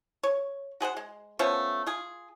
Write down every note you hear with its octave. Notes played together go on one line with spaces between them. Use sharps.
C#5
F#4 G#4 C5 F#5
G#3
F3 A3 B3 C#4
F4 G#4